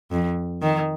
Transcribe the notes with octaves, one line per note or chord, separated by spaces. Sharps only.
F2
D#3